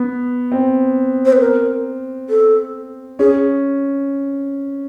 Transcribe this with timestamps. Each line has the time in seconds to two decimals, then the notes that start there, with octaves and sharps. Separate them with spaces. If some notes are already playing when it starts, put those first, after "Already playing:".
Already playing: B3
0.52 C4
1.26 C5
1.33 B4
1.40 A#4
2.29 A4
3.19 C#4 G#4